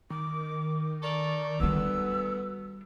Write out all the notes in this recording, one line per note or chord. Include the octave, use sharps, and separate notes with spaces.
D#3 D6
A4 A#4 D5 C#6
D2 G3 B3 D4 E6